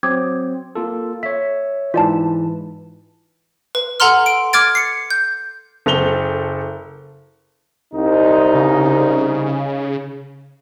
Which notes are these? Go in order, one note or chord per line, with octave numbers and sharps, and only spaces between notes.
F#3 C4 D6 D#6 G#6
A#3 F4 A4
C#5 E5 B6
G#2 E3 F4 D5 A5
B4
A4 F#5 A#5 C6 F6
D7
D6 F6 G#6 A6 D7
C7 C#7
G6
F#1 A4 F7 G7
C2 D#4
C#3